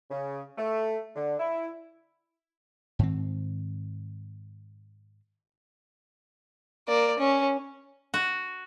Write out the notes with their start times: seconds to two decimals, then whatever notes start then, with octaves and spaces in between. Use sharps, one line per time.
0.10 C#3
0.57 A3
1.15 D3
1.39 E4
2.99 G#2 D#3 C4
6.88 A#3 D5
7.19 C#4
8.14 F#4